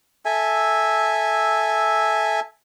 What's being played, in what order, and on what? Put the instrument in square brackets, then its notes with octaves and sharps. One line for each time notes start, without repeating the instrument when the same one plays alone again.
[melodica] A4 E5 G#5